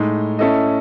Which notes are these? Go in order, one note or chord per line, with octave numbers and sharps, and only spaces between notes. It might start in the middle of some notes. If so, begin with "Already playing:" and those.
Already playing: A2 G#3 D#4
A3 C#4 E4 A4 D#5